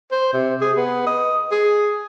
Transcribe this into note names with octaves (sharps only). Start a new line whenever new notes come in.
C5
C3
G#4
B3
D#5
G#4